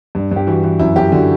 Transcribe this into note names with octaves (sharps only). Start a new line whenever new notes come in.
G2
G2 G4
E3 F#4
E3
F#2 E4
F#2 G4
D3 F#4